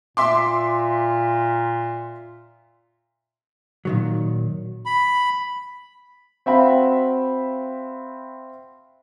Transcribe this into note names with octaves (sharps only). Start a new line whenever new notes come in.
A#2 E5 C6 D6
A#2 D#3 F#3
B5
C4 F#4 E5 F5 G5 B5